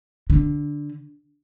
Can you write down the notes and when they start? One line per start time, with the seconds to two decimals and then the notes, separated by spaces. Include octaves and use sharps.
0.30 D3